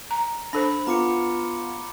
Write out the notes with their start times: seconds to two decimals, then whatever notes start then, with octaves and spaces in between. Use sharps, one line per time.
0.11 A#5
0.53 D4 A4 C5 B5
0.87 B3 F4 A#5 D6 C#7